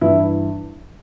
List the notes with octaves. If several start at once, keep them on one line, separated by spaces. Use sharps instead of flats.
G2 E3 E4